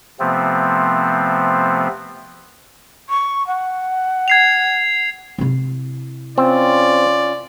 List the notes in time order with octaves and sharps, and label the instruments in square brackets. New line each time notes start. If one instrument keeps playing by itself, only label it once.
[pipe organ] C3 F3 A3 B3 C4
[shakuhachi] C#6
F#5
[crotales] G#6 C7 F7
[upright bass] C3 E4
[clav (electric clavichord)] C4 [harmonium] C#4 F4 [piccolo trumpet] D5